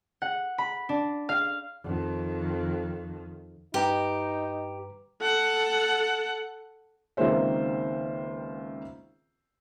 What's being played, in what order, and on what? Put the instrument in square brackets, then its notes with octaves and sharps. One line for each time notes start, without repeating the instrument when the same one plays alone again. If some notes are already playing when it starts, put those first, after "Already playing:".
[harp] F#5
B5
D4
F5
[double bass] F2 D#3
[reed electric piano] G2 B4 A#5 [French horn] D#4 [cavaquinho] G4
[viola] A4 F#5
[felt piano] C#2 D#3 A#3 C4 C5 E5